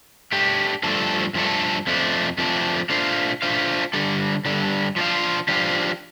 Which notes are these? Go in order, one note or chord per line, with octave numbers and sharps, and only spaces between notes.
A3 D4 G4
G2 F3 A3 D4 A4
G2 F3 A3 D4 A4
F2 F3 A3 D4
F2 F3 A3 D4
A3 D4 F4 C5 F5
A3 D4 F4 C5 F5
G2 D3 G3 D4 A4
G2 D3 G3 D4 A4
F3 D4 G4 C5 F5
F3 D4 G4 C5 F5